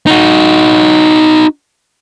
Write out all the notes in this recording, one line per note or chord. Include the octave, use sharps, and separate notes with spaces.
D#4 F#4